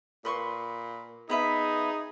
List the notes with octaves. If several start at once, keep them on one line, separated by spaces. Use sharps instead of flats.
A#2 B4 C6 C#6
B3 D#4 G#4 B4 E5